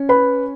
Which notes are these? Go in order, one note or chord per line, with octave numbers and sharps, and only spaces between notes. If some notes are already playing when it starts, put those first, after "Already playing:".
Already playing: C#4
B4 B5